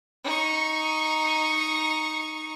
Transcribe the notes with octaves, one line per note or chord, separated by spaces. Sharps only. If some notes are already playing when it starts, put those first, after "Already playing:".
D#4 C#6